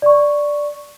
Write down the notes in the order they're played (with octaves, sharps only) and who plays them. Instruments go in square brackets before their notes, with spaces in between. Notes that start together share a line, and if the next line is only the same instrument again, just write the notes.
[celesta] D5 C#6